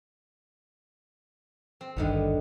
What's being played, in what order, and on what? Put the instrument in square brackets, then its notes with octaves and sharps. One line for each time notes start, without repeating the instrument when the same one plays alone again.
[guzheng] C4
[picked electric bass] G#1 D2 G2 [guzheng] D3 D#3 B3